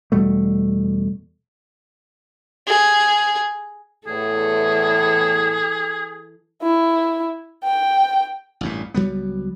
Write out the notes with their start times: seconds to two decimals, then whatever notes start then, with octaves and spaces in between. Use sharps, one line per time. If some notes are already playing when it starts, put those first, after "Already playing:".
0.12 E2 B2 G3 A3
2.67 G#4
4.07 E2 A2 E3 G#4 A4
6.62 E4
7.64 G5
8.61 A1 G2 A#2
8.94 C#2 F#3 G3 B3